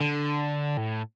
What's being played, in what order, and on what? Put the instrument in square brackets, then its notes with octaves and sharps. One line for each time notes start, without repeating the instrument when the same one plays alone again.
[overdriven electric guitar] D3
A2